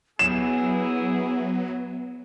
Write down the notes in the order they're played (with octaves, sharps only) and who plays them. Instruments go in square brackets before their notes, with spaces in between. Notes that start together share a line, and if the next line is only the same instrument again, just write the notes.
[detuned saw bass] F#3 [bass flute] B3 [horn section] E4 G#4 [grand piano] E7